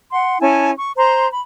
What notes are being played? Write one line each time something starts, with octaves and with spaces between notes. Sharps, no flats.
F#5 C6
C#4 E4 G#5 A5
C#6
C5 A#5 C6
B5